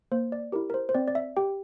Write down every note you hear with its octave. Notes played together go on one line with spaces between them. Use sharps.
A#3 C5
D5
E4 G4 A#4
A#4
C5
C5
C4 D5
D5
E5
G4 G5